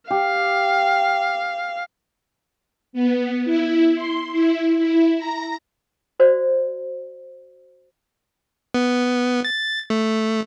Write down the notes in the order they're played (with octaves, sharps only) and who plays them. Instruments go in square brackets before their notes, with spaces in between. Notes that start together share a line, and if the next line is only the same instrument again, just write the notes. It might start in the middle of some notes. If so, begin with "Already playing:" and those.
[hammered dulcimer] G4 [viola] F5
[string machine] B3
E4
C6
E4
E4
A#5
[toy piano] F#4 C5 D5
[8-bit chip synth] B3
A6
A3